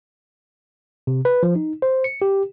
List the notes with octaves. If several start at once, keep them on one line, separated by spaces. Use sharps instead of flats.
C3
B4
F3
D#4
C5
C#7
G4